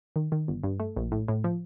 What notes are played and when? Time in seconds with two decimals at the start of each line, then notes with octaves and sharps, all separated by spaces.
0.16 D#3
0.32 D#3
0.48 G1
0.63 G2
0.80 A3
0.97 A#1
1.12 A2
1.28 A2
1.44 F3